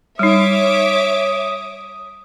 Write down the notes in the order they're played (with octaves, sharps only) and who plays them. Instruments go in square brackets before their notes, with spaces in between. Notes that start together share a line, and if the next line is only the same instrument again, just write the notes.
[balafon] G3 D#4 [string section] C#5 E5 D6 [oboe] D#6